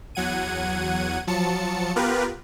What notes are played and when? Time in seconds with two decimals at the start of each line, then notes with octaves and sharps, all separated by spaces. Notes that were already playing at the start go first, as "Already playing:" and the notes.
0.15 E2 F#3 F#5 G#6 D#7
1.27 F3 F#3 A5 C#7
1.96 B3 F4 G4 A#4 B4